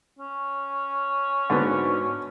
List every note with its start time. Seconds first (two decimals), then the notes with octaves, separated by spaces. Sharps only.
0.19 C#4
1.50 G#2 D3 B3 D4 F#4